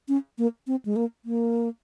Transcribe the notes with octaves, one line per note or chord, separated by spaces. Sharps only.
C#4
A#3
C4
G#3
A#3
A#3